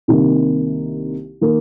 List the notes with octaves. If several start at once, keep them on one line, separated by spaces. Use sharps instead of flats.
C2 C3 D#3 A#3 D#4
D#3 A#3